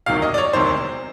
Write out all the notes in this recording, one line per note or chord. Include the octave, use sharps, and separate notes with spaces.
E1 D2 C3 D#3 F#3 F5
D#5
D5
C#5
E1 D2 C3 D#3 F#3 C5